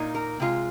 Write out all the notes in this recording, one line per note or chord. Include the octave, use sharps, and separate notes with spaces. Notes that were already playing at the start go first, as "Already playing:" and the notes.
Already playing: A#2 A#3 D#4
A#4
C3 G#3 F4